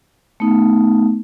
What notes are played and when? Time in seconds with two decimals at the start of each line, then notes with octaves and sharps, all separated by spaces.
0.40 A3 B3 D#4